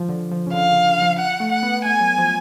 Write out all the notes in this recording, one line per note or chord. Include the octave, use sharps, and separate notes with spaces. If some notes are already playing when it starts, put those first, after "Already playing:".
Already playing: F3
D3
F3
C#3
D3 F5
C#3
D3
F3
F#5
A3
F#5
B3
A3 G#5
F#3
F3